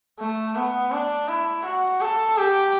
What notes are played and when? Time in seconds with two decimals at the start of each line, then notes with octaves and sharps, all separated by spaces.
0.19 A3
0.56 B3
0.92 D4
1.28 E4
1.65 F#4
2.01 A4
2.37 G4